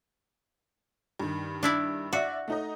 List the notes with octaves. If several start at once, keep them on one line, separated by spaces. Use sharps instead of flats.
G2 D#3
D4 E4 D5
F#4 D5 E5
A3 D#4 D#5